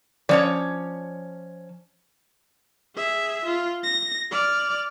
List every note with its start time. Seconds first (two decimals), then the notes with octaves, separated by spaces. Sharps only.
0.29 F3 C#4 C#5 D5
2.96 G#4 E5
3.45 F4
3.84 A#6
4.31 D5 F6